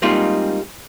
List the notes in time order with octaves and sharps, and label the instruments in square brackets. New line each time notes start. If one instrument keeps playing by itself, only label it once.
[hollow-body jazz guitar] G3 G#3 A#3 C4 D#4 F4